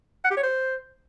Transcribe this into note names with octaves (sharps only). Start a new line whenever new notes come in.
F#5
G4
C#5
C5